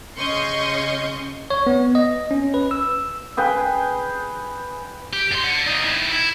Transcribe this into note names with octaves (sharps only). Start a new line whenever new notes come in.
C#3 C#4 D#5 C6 C#6 G6
C#5
B3
D#5
C#4
B4
E6
G#4 B4 G5 G#5
G4
F#2 C6
D5 F#5
A#3 D#4
D#3 E4
E4